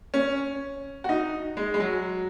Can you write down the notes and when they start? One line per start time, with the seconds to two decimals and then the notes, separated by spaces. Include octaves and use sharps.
0.14 C#4
1.04 F#4
1.09 D#4
1.57 G#3
1.74 G#3
1.80 F#3